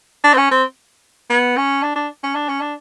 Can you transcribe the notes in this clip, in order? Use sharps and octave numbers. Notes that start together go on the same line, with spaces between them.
D4
C4
C#4
C4
B3
C#4
D4
D4
C#4
D4
C#4
D4